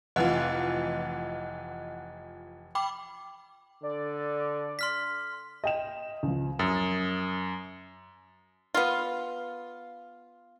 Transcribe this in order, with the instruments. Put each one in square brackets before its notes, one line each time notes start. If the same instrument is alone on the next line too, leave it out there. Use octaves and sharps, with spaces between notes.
[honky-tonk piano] F1 E3 F4 [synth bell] D#5 F#5 F#6
[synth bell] G5 B5 D6
[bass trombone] D3 [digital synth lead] D5
[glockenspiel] C6 F6 B6
[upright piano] D#5 G5 E7
C#2 F3
[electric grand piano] F#2 [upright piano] D#6 A6
[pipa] B3 F4